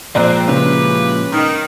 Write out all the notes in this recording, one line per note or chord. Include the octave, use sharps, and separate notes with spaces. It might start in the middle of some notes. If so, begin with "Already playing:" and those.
A#2 F3 G#3 C4 D5 A#5 F#6
C#3 E3 G4 B4
D#3